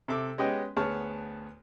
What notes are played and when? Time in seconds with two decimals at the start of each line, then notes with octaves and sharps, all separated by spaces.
0.08 C3 A4 E5 D6
0.38 G#3 B3 C#4 G4 D#5 G5
0.77 D2 B3 G#4 C#5 A5 F6